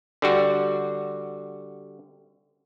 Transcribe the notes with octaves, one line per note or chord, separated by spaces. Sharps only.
D3 G3 F#4